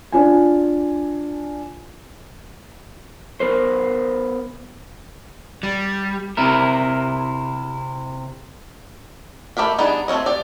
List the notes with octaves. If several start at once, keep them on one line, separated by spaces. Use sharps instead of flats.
D4 F4 G#5
B3 A#4 C5
G3
C3 E4 A#4
A3 G4 A#4 B5
G3 B3 D4 D#4 G#4
A3 C4 A4 C#5 D#5
G4 D5